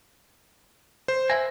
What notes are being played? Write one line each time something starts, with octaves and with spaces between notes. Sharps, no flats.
C5
B4 E5 G#5 A#6